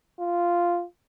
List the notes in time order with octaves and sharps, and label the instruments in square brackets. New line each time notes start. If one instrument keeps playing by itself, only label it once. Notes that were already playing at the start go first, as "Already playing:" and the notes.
[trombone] F4